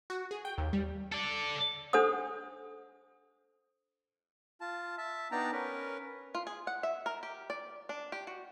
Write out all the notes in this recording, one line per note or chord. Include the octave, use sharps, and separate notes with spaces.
F#4
G#4
G5
D#2
G3
A4 D5
D4 A4 C5 F#5 D#6
F4 A5
E5 A5
B3 D4 D#4 G5 A5 A#5
C#4 A#4 B4
F4
G#4
F#5
E5
A#4
G4
D5
D4
G4
F#4